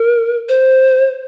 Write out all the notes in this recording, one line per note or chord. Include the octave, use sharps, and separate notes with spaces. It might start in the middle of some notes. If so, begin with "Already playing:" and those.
Already playing: A#4
C5